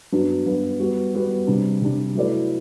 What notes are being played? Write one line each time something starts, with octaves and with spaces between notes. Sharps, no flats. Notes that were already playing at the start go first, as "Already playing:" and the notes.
G2 F#3 B3 D4
G2 F#3 B3 D4
G3 B3 F#4
G3 B3 F#4
C3 G3 D4
C3 G3 D4
F#3 A3 E4 B4 D5